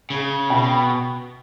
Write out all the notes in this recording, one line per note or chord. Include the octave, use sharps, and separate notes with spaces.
C#3
B2 G5